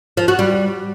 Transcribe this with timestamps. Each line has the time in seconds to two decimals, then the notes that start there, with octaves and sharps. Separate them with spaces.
0.17 F3
0.28 F#4
0.39 G3